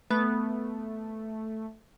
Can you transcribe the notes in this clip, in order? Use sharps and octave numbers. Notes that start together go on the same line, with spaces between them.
A3 B3